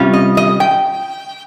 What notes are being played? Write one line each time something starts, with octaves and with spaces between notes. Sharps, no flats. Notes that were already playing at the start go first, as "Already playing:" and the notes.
Already playing: C3 G3 C#4 F4
D#5
D#5
G5